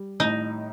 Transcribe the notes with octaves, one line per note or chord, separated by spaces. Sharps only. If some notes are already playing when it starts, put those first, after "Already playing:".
Already playing: G3
A2 D#4